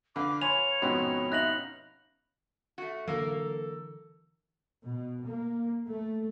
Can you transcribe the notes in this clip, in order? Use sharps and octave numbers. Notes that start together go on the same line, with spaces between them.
D3 B4 F5 A#5 D6
C#5 G#5 B5 C6 F7
F2 G#2 B2 B3 C#4
D#4 E5 F5 A#5 F#6 A#6 F#7
A3 F#4
D3 E3 F#3 A#3 A4 A#4
B2
A#3
A3